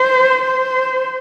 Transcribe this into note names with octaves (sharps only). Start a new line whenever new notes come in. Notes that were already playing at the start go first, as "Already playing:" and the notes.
Already playing: C5
C5